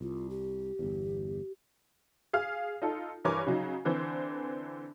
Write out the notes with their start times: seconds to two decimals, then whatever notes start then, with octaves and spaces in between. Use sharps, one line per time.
0.01 C2 F4
0.30 G4
0.79 G1 E2
2.33 G#4 F5 F6
2.82 D#4 F4 A4
3.25 G2 E3 A#4 C#5 G#5 D6
3.47 C#3 F#3 D#4
3.85 D3 E3 C4